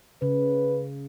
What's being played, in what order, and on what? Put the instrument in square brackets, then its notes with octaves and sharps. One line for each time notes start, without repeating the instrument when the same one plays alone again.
[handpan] C#3 [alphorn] B4